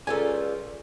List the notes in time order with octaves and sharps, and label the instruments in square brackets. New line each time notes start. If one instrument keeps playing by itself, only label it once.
[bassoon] C#2 [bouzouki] G3 F4 A#4 [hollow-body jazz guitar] A4 G#5